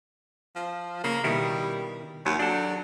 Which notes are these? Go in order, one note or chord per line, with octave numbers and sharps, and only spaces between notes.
F3
C#3 A#3
B2 D#3 G3 E4
D#2 F#3
F#3 D4 A4